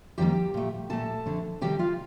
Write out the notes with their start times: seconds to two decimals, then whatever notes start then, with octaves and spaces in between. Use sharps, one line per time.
0.18 F2 D#3 G3 A#3 G4 G5
0.54 A#2 A3
0.90 A#2 A3 A4 A5
1.26 F2 D3 A3
1.61 C3 D#3 G3 G4 G5
1.79 F4 F5